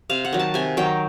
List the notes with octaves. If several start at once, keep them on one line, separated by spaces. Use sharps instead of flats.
C3 F5
F#5
D#3 F#3
A5
C3 G#5
D#3 F#3 G5